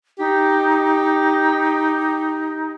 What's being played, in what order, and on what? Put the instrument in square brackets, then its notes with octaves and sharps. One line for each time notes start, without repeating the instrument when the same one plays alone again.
[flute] D#4 [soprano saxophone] G4